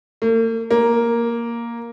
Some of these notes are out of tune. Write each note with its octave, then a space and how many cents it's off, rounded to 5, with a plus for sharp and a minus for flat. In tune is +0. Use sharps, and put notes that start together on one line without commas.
A#3 -45
A#3 +5